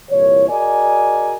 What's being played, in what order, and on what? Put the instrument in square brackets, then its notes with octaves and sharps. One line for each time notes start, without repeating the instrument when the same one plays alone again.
[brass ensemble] C2 A#2 E3 C#5
F#4 G#4 A#4 D5 D#5 G#5